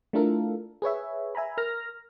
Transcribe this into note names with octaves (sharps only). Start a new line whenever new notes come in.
A3 D4 E4 F4 A4 A#4
G#4 B4 C#5 E5
E5 G#5 A#5 B5
A#4 F6 A#6